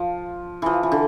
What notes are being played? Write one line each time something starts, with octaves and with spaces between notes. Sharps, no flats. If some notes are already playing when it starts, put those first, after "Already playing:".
Already playing: F3
E3 F3
E3
D3